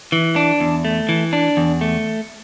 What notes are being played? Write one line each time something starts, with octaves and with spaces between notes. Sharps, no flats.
E3
D4
E2
A3
E3
D4
E2
A3